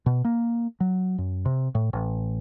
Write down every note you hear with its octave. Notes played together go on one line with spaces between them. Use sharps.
B2
A#3
F#3
F#2
C3
A2
A1